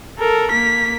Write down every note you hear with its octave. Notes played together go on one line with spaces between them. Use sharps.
A4 A#4
A#3 B6